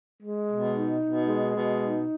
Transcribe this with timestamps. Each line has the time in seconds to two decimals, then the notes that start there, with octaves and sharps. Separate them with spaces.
0.23 G#3
0.49 B2
0.76 D#4
1.02 B2
1.28 G#3
1.55 B2
1.81 D#4